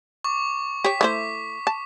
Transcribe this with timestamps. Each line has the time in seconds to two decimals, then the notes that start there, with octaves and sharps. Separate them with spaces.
0.24 C#6 D6
0.84 G4 C#5 B6
1.01 A3 E4 C5 D6
1.67 A5